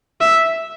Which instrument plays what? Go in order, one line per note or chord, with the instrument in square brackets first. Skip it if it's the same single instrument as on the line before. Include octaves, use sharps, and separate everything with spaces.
[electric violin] E5